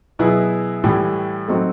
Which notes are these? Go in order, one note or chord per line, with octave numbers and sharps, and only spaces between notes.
B2 F#3 B3 E4 G#4
A2 E3 G3
F#3 A3 C4 D#4 F#4